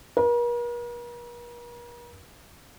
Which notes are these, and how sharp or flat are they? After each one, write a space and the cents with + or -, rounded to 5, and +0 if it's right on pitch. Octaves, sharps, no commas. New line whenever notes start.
A#4 +45